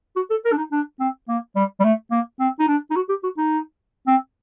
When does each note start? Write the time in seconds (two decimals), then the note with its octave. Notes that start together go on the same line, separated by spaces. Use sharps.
0.16 F#4
0.30 A4
0.45 A#4
0.52 D4
0.58 D#4
0.72 D4
1.00 C4
1.29 A#3
1.56 G3
1.80 G3
1.84 A3
2.11 A#3
2.40 C4
2.60 D#4
2.68 D4
2.91 D#4
2.96 F#4
3.09 G4
3.24 F#4
3.38 D#4
4.07 C4